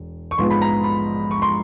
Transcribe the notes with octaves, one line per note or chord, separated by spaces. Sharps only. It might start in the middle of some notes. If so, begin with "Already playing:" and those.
Already playing: E1
C#6
A#1 G#2 F3 G#3 B3 C6
B5
A#5
B5
C#6
C6